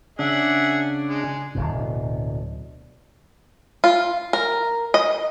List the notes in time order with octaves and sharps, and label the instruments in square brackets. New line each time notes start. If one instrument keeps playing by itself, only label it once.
[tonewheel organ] C#3 D4 [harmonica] G#4 E5 F#5
[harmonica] G#3
[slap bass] D1 G#1 B2
[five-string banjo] F4
A#4
D#5